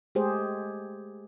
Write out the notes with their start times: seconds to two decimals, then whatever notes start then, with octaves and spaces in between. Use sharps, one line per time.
0.15 G#3 A3 G4 G#4 C5